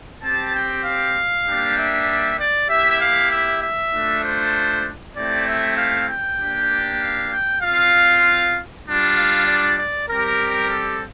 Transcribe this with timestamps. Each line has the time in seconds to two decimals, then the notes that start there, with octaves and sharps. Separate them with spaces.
0.23 C4 G4 A5
0.55 G5
0.85 F5
1.46 G3 A#3 D4 G4
1.77 E5
2.39 D5
2.69 A#3 E4 G4 E5
3.01 F5
3.31 E5
3.62 E5
3.93 A3 D4 F4
4.24 C5
5.15 A3 C4 E4 G4 D5
5.47 E5
5.78 F5
6.09 G5
6.39 A#3 D4 G4
7.01 F5
7.32 G5
7.62 C4 F4 F5
8.86 G3 D4 F4
9.16 F5
9.47 D5
9.78 D5
10.08 G3 C4 G4 A#4
10.70 A4